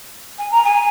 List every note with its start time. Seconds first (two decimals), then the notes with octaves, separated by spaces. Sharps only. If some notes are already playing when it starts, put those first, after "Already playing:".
0.38 G#5
0.51 A#5
0.64 G#5